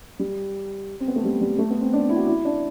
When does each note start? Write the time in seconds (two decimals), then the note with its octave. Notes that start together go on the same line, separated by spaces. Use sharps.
0.19 G3
1.00 C4
1.08 B3
1.16 A3
1.24 G3
1.41 G3
1.59 A3
1.71 B3
1.81 C4
1.93 D4
2.09 E4
2.16 F#4
2.27 E4
2.45 D4